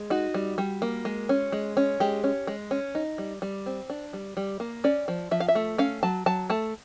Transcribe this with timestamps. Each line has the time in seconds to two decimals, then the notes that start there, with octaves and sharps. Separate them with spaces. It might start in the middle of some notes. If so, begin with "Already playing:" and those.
Already playing: G#3
0.10 D#4 F#4
0.34 G3
0.58 G3
0.82 A#3
1.05 G#3
1.29 C#4
1.52 G#3
1.77 C#4
2.00 G#3 G4
2.24 C#4
2.47 G#3
2.71 C#4
2.95 D#4
3.18 G3
3.42 G3
3.66 C4
3.90 D4
4.13 G3
4.37 G3
4.60 A#3
4.84 C#4 D5
5.08 F3
5.31 F3 E5
5.40 F5
5.48 E5
5.55 A3
5.78 C#4 F5
6.03 F#3 A5
6.26 F#3 A5
6.50 A3 A5